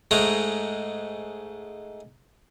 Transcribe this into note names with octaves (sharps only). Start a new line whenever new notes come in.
G#2 G#3 A3 A#5